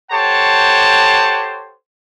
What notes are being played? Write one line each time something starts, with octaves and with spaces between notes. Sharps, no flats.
G4 A4 C5 C#5 F#5 A5